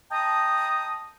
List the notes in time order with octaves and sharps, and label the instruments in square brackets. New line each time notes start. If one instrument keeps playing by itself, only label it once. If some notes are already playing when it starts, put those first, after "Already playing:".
[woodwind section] D#5 G5 A5 A#5 D#6